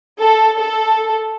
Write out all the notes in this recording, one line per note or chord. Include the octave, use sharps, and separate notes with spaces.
A4
A4